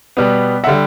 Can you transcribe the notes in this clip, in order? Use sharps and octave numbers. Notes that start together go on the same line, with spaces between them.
B2 G3 B3
E5 F#5
D3 G3